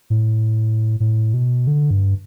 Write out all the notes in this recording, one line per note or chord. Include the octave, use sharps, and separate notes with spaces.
A2
A2
B2
D3
G2